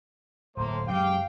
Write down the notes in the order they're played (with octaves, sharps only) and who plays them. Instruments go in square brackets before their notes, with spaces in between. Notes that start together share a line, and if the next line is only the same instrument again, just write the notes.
[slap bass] D1 [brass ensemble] A2 A#3 [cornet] C5
[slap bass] F#2 C#3 G#3 [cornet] G4 [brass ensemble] F5 G5